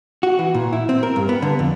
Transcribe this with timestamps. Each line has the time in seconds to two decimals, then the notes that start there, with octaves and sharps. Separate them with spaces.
0.23 F#4
0.39 E3
0.54 A#2
0.73 E4
0.89 C4
1.03 A#4
1.16 G2
1.29 B3
1.42 D3
1.59 F2